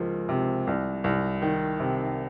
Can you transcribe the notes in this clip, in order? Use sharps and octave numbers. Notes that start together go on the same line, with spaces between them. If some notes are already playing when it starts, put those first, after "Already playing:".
Already playing: C#2 F3 A#3
C3
C2
C2
D#3
C3